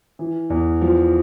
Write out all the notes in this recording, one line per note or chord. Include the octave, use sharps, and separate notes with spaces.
E3
E2
F3